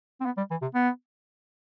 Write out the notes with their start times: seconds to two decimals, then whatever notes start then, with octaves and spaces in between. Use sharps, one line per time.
0.20 C4
0.26 B3
0.37 G3
0.51 E3
0.62 C3
0.74 B3